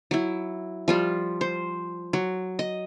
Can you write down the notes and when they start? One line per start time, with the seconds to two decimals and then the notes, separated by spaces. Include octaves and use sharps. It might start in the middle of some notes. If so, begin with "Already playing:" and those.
0.11 F#3 E4
0.88 F3 G3 F4
1.41 C5
2.13 F#3
2.59 D#5